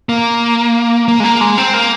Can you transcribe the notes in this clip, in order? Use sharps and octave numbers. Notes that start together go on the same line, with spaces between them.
A#3
A#3
G#3
A#3
G#3
C4
A#3